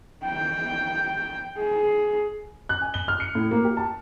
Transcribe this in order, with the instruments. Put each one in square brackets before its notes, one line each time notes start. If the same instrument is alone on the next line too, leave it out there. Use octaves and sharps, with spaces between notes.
[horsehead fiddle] G5
G#4
[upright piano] F#6
G#5
G7
F6
C#7
A2
A#3
G4
A5